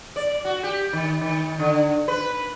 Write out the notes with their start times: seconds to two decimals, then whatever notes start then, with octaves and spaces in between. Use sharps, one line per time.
0.16 D5
0.45 F#4
0.63 G4
0.93 D#3
1.21 D#3
1.59 D3
2.08 B4